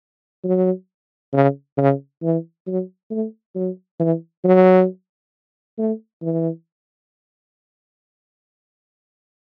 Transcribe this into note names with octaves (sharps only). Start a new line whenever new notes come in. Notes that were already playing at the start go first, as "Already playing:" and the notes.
F#3
C#3
C#3
E3
F#3
A3
F#3
E3
F#3
A3
E3